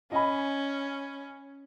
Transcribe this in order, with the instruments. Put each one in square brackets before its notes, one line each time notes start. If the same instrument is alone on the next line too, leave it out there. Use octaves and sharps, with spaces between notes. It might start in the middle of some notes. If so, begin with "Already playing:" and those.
[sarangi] C#4 [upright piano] D#5 G#5 B5